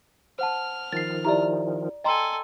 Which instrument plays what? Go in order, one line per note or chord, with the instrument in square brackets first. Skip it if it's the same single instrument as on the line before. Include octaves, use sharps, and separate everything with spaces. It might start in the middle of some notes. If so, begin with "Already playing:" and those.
[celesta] C5 F#5 A5 [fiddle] F6
[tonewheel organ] D#3 F3 [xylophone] A6 C7
[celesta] E4 G4 E5 [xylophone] D5 A#5
[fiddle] A4 G#5 [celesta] D#5 A#5 C6 [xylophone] G5